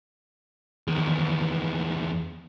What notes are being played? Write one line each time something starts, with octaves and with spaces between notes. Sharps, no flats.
E2 D#3